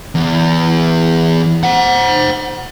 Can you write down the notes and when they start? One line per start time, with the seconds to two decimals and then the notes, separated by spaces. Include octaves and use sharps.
0.15 E2
1.63 C5 F#5